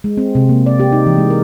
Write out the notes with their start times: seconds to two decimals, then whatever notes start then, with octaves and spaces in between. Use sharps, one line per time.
0.04 G#3
0.17 C4
0.35 C3
0.49 A#3
0.66 D5
0.80 G4
0.92 D#4
1.06 E3
1.18 G#3
1.30 A#4